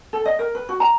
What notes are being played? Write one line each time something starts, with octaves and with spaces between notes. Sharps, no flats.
A4
D#5
A#4
B4
F#4
A#5